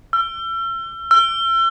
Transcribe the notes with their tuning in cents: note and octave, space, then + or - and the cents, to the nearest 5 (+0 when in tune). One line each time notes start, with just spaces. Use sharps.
E6 +40
E6 +40